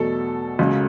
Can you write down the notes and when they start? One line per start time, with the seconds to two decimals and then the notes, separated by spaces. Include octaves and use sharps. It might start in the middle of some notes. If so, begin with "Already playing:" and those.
Already playing: E2 B2 F#3 A3 A4
0.59 C#2 C#3 F#3